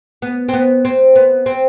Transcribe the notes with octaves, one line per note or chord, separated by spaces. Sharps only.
B3
C4
B3
C4
B3
C4